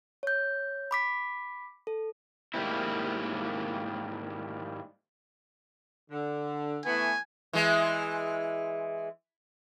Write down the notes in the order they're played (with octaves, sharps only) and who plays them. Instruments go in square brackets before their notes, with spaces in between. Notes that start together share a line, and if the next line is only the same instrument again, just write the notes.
[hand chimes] C#5 G6
B5 D6 B6
A4
[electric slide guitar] G#2 D#3 G3 A#3 C4 E4
[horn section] D3
[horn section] E3 A3 B3 [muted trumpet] G#5
[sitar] E3 G#3